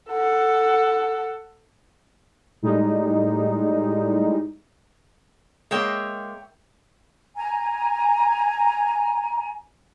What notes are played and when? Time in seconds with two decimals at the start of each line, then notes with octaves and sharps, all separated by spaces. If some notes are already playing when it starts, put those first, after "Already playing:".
0.10 A4 F#5
2.62 A2 G3 G#3 D#4
5.71 G#3 A#3 C#5 E5 G5
7.35 G#5 A#5